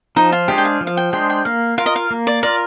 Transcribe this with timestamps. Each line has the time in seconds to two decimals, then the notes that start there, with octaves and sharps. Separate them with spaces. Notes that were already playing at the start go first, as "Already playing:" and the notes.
0.16 F3 D#4
0.32 F4
0.48 G#3 D4 G4 G#4 C5
0.58 G5
0.65 F5
0.81 F3
0.87 F5
0.97 G5
1.13 G#3 D4 G#4 C5 G5
1.30 G5
1.45 A#3 F5
1.78 F4 A#4 F5
1.86 D#5
1.96 F5
2.11 A#3
2.27 D5
2.43 F4 A#4 D5